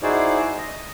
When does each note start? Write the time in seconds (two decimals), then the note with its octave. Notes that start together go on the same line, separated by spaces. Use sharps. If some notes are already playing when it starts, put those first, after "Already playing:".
0.02 D#4 E4 F#4 G#4 C5 D5
0.58 D#5